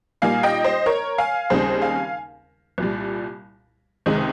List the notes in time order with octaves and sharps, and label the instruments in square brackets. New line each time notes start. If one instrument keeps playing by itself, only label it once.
[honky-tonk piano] A#2 G3 A#3 D#4 F5 G#5
D#5 G5
C5 D#5
A#4 C#5
F5 G#5
D#2 C#3 G3 C4 D#4 G#4 C5
F5 G#5
C2 A#2 G3
C#2 C3 D#3 G#3 D#4